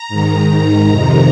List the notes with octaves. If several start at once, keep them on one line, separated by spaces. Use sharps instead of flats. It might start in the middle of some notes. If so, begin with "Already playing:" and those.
Already playing: A#5
G#2 D#3
F2 C3 D#3